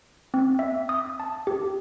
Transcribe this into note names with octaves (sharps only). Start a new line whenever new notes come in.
C4
E5
D#6
A5
G4